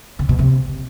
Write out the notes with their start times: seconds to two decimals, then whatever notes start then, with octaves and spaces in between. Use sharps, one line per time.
0.19 C#3
0.29 B2
0.39 C3